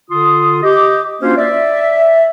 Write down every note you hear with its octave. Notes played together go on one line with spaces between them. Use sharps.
D3 F4 C6 D#6
G4 D#5 D6
A#3 C#4 D4 F4 F#4 C5
D5 E5